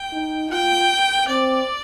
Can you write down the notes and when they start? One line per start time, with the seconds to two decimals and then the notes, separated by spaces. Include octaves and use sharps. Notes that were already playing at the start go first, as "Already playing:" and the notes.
Already playing: G5
0.12 D#4
0.51 F4 G5
1.28 C4 D5